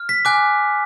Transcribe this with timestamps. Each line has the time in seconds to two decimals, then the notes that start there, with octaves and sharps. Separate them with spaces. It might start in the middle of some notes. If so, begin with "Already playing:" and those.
Already playing: F6
0.09 B6
0.25 G#5 D6 F#6